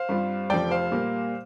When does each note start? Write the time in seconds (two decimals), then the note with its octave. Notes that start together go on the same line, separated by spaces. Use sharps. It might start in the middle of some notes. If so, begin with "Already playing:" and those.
Already playing: C5 F5
0.09 G2 G3 C4 F4
0.50 F1 F2 F3 D5 G5
0.71 C5 F5
0.92 A#2 G3 A#3